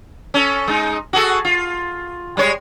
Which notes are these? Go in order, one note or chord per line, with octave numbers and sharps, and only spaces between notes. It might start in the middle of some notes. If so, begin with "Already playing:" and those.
C#4 A4
G#3 D#4
F#4 G#4 A4
F4
G3 G#3 C#5